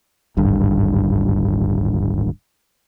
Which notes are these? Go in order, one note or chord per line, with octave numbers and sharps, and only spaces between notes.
D1 G#1 G2